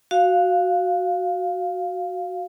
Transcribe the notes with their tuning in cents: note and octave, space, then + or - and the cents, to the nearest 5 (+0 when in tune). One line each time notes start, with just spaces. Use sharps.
F#4 +0 F5 +0